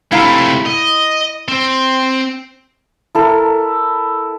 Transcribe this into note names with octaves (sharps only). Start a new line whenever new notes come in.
C3 A3 E4 F5 A#5
D#5
C4
E4 A4 A#4